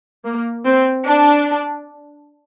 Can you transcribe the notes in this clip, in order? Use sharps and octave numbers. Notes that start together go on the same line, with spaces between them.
A#3
C4
D4